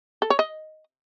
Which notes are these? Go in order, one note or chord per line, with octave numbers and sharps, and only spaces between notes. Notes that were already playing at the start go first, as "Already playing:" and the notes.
A4
C#5
D#5